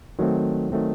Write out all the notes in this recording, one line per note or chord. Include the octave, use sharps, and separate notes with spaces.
D#3 F#3 A3 C4
D#3 F#3 A3 C4